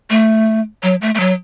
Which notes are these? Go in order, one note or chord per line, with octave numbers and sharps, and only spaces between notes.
A3
F#3
A3
A3
F#3